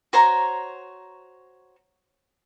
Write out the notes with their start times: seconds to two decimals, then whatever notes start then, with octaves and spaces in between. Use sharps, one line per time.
0.13 F#4 C5 C#5 A#5